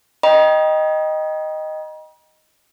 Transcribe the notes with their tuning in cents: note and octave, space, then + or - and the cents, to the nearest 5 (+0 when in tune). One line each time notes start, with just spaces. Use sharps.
D#5 +0 G5 +0 A#5 +45